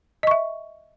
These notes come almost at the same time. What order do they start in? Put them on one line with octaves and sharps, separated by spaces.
D#5 C#6 E5